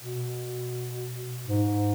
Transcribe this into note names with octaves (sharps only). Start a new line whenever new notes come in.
B2
G#2